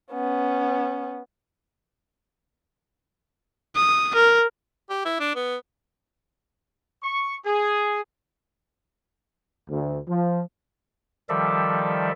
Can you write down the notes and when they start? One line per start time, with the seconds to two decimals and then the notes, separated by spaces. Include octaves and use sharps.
0.13 B3 C#4
3.76 D#6
4.15 A#4
4.90 G4
5.05 E4
5.20 D4
5.35 B3
7.03 C#6
7.45 G#4
9.70 D2
10.09 F3
11.29 D#3 F3 G3 A4 D5 E5